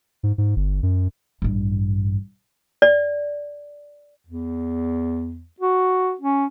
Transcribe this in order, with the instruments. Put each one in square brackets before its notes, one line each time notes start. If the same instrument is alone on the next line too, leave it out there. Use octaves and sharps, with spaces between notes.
[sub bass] G#2
G#2
G1
F#2
[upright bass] A1 G2
[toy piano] D5
[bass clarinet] E2
F#4
C#4